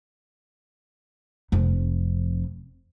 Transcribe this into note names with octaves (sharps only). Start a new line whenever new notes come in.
F1 F2